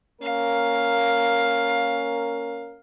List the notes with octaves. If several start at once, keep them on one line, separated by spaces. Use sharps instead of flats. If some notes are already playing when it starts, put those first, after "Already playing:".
A#3 C#4 A#4 F5